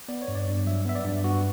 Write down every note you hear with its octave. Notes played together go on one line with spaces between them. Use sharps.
B3 D5
C#5
G2
D5
G2
F#3 E5
B3 E5
D5
G2
B3 F#4